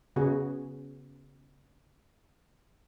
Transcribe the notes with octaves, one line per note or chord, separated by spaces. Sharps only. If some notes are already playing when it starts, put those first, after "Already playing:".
C#3 B3 F#4 G#4